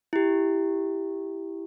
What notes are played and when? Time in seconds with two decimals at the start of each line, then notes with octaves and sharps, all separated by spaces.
0.13 E4 G4